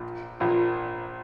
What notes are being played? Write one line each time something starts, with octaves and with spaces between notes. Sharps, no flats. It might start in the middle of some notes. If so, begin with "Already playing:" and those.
Already playing: A#1 A#2
A#1 A#2